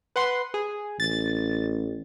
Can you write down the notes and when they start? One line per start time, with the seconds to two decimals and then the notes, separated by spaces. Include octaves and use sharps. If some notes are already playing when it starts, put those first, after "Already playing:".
0.16 B4 F#5 C6
0.54 G#4
1.00 A1 A6